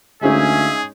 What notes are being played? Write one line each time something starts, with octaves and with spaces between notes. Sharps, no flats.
D2 G#3 C#4 D#4 G#4 E5 F5 G#5